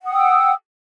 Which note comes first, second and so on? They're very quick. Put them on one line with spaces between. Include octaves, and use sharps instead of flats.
F#5 D#6 G5 E6